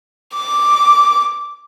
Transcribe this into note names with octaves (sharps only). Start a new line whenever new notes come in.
D6